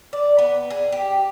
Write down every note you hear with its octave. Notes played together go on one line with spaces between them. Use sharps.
D5
B3
G#4
G4